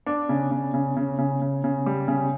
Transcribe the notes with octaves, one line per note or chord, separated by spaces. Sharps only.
D4
C#3
C#3
C#3
C#3
C#3
C#3
C#3
G3
C#3